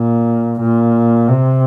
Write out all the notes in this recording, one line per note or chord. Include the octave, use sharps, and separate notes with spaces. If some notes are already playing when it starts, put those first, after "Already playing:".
Already playing: A#2
A#2
C3